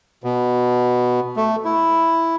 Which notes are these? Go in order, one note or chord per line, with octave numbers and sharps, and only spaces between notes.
B2
A3
E4